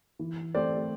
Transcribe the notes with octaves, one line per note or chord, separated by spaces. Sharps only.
E3
A3 C4 C5 D5